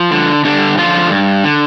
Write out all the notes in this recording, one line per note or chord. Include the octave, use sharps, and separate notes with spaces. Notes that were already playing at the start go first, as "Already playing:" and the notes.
Already playing: F3 F4
D3
G2 D3 D4
D3 F3 F4
G2
D3